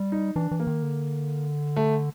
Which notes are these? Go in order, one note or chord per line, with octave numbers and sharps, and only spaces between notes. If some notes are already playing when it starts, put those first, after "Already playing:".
Already playing: G3
D#4
E3 D4
E3
A#3
D#3
D3
A3